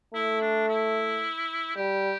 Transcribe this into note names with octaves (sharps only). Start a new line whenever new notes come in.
A3 E4
D4
E4
G3 G4